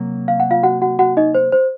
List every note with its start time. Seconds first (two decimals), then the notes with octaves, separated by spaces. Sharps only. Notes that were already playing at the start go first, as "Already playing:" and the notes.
Already playing: C3 F#3 A#3
0.28 F5
0.40 F#5
0.50 F4 F5
0.63 F#4 F#5
0.82 F#4 F#5
0.99 F#4 F#5
1.17 D#4 D#5
1.35 C5
1.52 C5